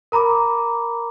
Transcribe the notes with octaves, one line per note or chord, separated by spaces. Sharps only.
A#4 A#5 B5 D6